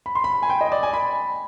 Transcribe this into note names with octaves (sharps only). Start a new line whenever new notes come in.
B5
C6
B5
G#5
G5
D#5
D5
G#5
B5